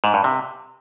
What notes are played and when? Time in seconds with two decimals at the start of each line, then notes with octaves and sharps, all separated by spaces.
0.04 G#2
0.14 G2
0.24 C3